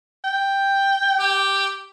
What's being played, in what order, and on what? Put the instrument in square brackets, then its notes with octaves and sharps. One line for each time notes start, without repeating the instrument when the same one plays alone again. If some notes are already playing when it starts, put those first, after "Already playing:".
[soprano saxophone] G5
[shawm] G4